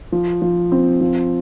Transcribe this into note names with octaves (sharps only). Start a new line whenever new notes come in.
F3
F3
C4
F3